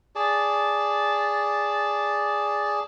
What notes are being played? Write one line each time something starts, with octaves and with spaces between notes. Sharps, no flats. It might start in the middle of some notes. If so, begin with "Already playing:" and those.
G#4 D5 A5